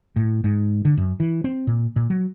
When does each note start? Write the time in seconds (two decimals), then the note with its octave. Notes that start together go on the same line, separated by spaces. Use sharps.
0.16 A2
0.44 G#2
0.85 D3
0.97 F#2
1.20 E3
1.44 C4
1.67 A#2
1.96 A#2
2.10 F#3